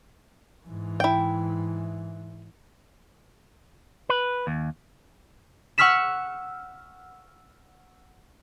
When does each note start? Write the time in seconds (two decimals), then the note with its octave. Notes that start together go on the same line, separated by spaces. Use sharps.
0.66 G#2 E3
1.00 E4 G5
4.09 B4
4.47 D#2
5.78 F#5 C#6 E6 F6 B6 E7